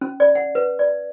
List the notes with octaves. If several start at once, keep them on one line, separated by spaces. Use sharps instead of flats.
C#4
D5
F#5
B4
D5